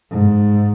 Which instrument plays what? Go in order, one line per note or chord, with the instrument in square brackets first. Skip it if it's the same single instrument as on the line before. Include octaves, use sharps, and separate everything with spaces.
[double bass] G#2